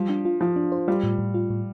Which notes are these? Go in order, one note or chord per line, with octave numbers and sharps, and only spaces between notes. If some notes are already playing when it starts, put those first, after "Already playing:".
Already playing: F3 G3
D4
F4
F3 F4
D4
C5
G3 F4
A2
A2
F4
A2